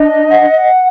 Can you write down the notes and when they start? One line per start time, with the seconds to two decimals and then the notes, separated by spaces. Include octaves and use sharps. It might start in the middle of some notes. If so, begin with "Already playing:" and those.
Already playing: D4 D#5
0.30 F#5